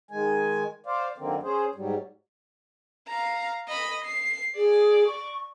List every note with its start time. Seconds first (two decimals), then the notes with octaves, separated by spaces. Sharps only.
0.11 D#3 G#3 G#5
0.86 C5 D5 F5
1.18 F#2 D3 D#3 A#3 C4
1.43 C#4 G#4 C5
1.75 G#2 F#3 G3
3.08 F5 A#5
3.68 D#5 B5
4.05 C7
4.56 G#4 D5
5.07 C#6